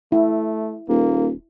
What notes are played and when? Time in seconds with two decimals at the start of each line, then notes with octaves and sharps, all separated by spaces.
0.12 A3 E4
0.89 D#1 A#3